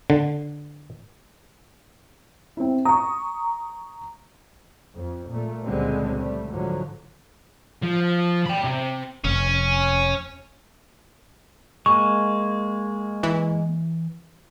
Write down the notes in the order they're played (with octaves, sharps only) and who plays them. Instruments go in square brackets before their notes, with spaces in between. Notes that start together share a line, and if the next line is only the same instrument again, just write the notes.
[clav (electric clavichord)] D3
[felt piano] C4 E4
[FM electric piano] A#5 [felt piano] C#6 D#6
[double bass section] F2
A#2 A3
C#2 A#2 D3 G3 G#3 C4
G3 A3
G#2 D3 F3 F#3
[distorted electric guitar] F3
G5 B5
C3
[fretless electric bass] F1 [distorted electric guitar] C#4
[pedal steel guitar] G#3 A#3 [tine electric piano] C#6
[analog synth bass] E3